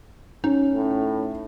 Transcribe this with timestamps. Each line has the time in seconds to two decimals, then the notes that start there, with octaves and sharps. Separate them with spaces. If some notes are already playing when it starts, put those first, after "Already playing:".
0.44 C#4 D#4
0.74 A2